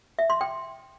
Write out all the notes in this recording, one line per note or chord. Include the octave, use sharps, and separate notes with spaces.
E5
C6
G5